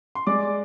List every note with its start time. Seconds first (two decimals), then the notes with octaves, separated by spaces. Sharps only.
0.15 C6
0.27 G#3 D5 D6